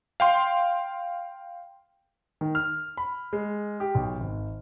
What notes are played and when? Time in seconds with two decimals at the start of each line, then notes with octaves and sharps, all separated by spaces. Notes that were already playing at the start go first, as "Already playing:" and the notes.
0.20 F5 G5 C6
2.41 D#3
2.55 F6
2.97 B5
3.33 G#3
3.80 G4
3.95 B1
4.20 G#1